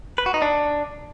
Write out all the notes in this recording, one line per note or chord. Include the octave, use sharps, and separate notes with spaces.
B4
F#4
D#4
D4